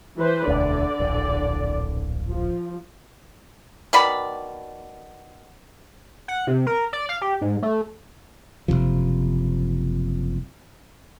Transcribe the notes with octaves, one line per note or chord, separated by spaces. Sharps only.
E3 B4 C5
E1 D2 D3 D5
D1 A#1
F3
B2 D#3 D5 B5
F#5
C3
A#4
D5
F5
G4
G#2
A3
F#1 C#2 C3 F3